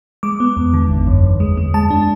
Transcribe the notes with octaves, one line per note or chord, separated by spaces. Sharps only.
G#3 D6
B3
E2
D3
G#1
F#2
E2
G#3
G#3
G#3 A5
D4